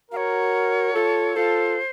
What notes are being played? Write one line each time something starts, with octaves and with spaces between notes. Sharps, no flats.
F#4 A#4 F5
C#5
F4 A4
F4 A4 C5